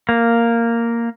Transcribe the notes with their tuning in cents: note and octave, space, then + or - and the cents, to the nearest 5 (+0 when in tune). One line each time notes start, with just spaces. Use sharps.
A#3 -5